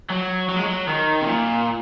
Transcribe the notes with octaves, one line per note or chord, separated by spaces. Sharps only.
F#3
F#3
G#3
F#3
D#3
C3
A#2